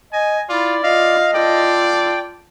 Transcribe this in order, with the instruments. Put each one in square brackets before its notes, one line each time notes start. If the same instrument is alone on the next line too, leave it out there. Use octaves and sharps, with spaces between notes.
[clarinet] D#5 [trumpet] G#5
[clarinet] E4 [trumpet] F4 [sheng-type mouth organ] D5
[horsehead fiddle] F4 [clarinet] D#5 [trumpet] F5
[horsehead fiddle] F4 A4 [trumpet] D5 [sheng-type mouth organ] G5